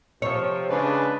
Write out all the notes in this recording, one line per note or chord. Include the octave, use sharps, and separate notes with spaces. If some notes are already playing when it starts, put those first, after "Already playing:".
C3 F3 C#5
C#3 G#3 D4 B4